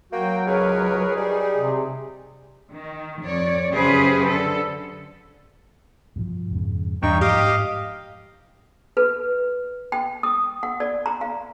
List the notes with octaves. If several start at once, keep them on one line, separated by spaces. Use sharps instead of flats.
F#3 A#3 F#4 G5
C#2 G#4 A#4 B4 C#5
G3 D#4
C3
D#3
F2 C#5 D5
F#2 C#3 G4 G#4 B4 C5
D3 A4
G2 B2 F3
F2 G#2 C#3
E2 G2 D#4 G5 C#6
G#2 F3 G4 D#5 F5
G#2
B4
G5
D#6
F#5
D5
A#5
F5